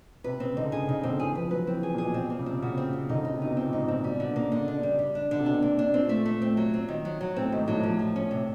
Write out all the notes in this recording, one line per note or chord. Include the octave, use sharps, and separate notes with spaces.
C3 B4
C#3 C4
D3 D#4
C#3 G#4
C#3 D#4
D3 C4
E3 G#4
F3 B4
F#3 B4
E3 C4
G#4
A#2
G#4
B2
B2 C4
A#2 C4
C#3
C3 C4
C#3 F#4
C4
C4
D3 D#4
C#3
D#4
C3
B2 D#4
A#2 C4
G#2 D#4
A#2 C4
B2 G3
B2 D3
C#3 A#3
D3
D4
G3
G3
D4
D3
C3
B2 D4
A#3
D4
A#2 C4
A3
A3
C4
F#3
C4
D#3
F#3
F#3
A2 C4
G#2 D#3
A2 F#3
A#2
A2 F3
F3
C#4
C3